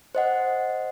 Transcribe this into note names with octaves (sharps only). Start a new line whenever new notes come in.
C5 D#5 F#5